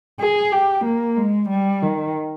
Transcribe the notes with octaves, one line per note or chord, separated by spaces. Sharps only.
G#4
G4
A#3
G#3
G3
D#3